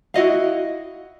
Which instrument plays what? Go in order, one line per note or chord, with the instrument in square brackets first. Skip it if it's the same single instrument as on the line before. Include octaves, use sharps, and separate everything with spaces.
[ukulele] E4 F#4 D#5 F5